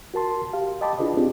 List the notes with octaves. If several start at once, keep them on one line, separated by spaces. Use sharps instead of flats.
F#4 A#4 A5 C6
G4 F5
D#5 G5 A5 B5 D6
D4 E4 F4 G#4 B4 D#5
C4 D4 D#4 F4 G4 G#4